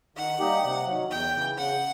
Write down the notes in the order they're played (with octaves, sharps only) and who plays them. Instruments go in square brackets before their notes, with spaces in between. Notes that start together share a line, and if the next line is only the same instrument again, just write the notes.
[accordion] D#3 [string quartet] F#5
[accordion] G3 A#3 D#4 G4
C3
D#3 F#3
[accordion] E2 [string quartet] G5
[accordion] C#3 E3
[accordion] C#3 [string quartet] F#5